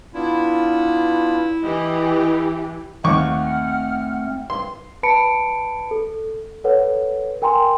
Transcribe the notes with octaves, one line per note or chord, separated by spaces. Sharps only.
B3 D4 E4 F4
E3 G4 D#5
D#2 A3 C4 F#5 C#6 D6 F6
C6
B4 A5 B5 C#7 D7
A4
A4 B4 C#5 F#5
A#4 G5 G#5 A#5 C6